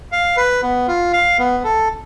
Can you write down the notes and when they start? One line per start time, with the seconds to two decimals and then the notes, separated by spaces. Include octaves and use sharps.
0.12 F5
0.37 B4
0.63 B3
0.88 F4
1.13 F5
1.39 B3
1.64 A4